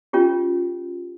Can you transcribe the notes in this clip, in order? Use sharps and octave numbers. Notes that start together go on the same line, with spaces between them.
C#4 F4 G4